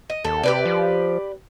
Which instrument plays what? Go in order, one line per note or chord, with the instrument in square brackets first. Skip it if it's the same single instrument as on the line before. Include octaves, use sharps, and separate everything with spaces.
[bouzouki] D#5
[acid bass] D#2 [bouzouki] A4
[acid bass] C3 [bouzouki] G4 B4 D5
[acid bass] F3